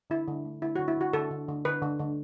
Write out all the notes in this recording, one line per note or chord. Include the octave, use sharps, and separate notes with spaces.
D3 E4
D3
A3
D3 E4
D3 F#4
E4
D3 F#4
D3 A4
D3
D3
D3 B4
D3
D3